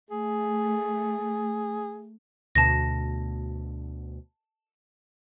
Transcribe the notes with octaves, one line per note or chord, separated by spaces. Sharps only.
A3 G#4
D2 B2 A5 A#6